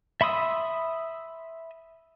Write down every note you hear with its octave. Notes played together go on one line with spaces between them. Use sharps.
E5 B5 C6 D#6 E6